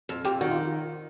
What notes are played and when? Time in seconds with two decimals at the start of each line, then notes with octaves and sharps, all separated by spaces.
0.09 F2
0.25 F2 G4
0.41 D#3 F#4
0.51 F4